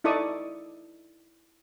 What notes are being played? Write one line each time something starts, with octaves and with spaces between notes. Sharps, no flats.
D#4 E4 A4 D5 C#6 D#6